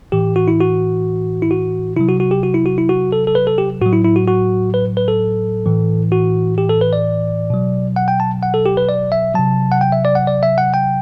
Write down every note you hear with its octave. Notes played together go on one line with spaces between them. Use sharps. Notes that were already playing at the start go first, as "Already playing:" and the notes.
A2 E3 G4
F#4
E4
F#4
E4
F#4
C3 F#3 E4
F#4
F#4
G4
F#4
E4
F#4
E4
F#4
A4
A4
B4
A4
G4
A2 F#3 F#4
E4
E4
F#4
F#4
B4
B4
A4
A2 E3
F#4
G4
A4
B4
D5
B2 F#3
F#5
G5
A5
F#5
A4
G4
B4
D5
E5
C3 F#3 A5
F#5
G5
E5
D5
F#5
D5
E5
F#5
G5